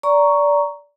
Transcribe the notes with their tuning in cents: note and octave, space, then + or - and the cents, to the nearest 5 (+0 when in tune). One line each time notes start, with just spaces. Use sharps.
D5 -20 A#5 +0 C#6 +5